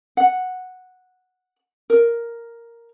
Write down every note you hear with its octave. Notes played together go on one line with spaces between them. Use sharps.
F#5
A#4